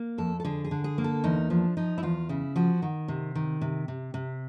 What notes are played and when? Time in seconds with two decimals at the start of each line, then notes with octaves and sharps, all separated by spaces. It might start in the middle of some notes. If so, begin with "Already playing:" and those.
Already playing: A#3
0.18 F2 A4
0.40 A4
0.45 D3 G#4
0.65 G#4
0.71 D3
0.84 G#4
0.98 A#3
1.04 A4
1.24 E2 D#4
1.50 F3 D4
1.77 F3 D#4
1.98 E4
2.03 E2 F4
2.29 C#3 E4
2.56 F3 F#4
2.82 D#3
3.08 C3
3.35 D#3
3.61 C3
3.88 C3
4.14 C3